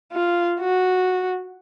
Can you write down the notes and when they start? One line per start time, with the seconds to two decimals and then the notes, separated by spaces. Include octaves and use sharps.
0.12 F4
0.60 F#4